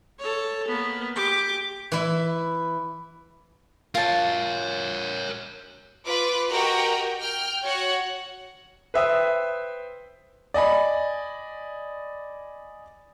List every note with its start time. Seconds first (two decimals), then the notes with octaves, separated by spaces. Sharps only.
0.19 A4 C#5
0.68 A#3 B3
1.16 G4 D6
1.92 E3 E4
3.95 F4 A#4 C#5 A5
6.05 F4 B4 D6
6.51 F#4 G4 A#4 D#5 G5 A#5
7.20 G5 F6
7.63 F#4 C#5 F#5
8.94 B4 C5 E5 G5 D#6
10.54 D5 D#5 G#5 B5